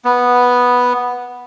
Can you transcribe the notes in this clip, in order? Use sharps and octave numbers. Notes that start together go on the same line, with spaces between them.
B3